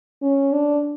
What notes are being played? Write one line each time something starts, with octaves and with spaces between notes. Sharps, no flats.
C#4
D4